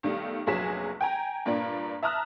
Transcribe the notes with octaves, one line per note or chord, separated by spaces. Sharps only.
B1 D#3 G3 A3
F1 A#1 F#3 G#4 B6 E7
G5 G#5 A#5
G2 A#2 A#3 D4
E5 A5 A#5 D#6 F6 F#6